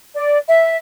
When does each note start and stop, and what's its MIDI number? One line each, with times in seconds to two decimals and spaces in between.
0.16 0.38 74
0.48 0.76 76